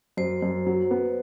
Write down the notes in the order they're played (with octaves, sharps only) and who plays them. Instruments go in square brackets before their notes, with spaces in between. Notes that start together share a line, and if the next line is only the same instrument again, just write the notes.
[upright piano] F#2 [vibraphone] C5
[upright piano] F#2
F#3
B3